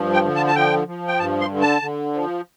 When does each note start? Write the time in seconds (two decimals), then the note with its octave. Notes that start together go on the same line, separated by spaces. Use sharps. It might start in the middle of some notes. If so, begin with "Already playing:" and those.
Already playing: G2 F3
0.14 G5
0.25 D3
0.35 A5
0.47 A5
0.56 F3 G5
0.87 F3
1.08 G5
1.19 G2 A5
1.40 C6
1.50 D3
1.61 A5
1.82 D3
2.14 F3